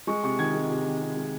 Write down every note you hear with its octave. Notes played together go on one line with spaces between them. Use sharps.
G#3 C#6
C3 C#6
D#3 G#6
G#3
C3
D#3
C3
G#3